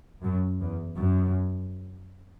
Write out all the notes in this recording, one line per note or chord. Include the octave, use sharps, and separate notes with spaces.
F#2
E2
F#2